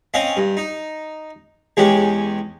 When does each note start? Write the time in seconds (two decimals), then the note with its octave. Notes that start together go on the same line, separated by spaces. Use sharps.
0.14 C4 C#4 D#5 F5
0.37 G2
0.57 D#4
1.77 E2 G#3 C#4 G4